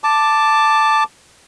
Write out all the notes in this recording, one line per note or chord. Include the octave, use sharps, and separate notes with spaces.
A5 D6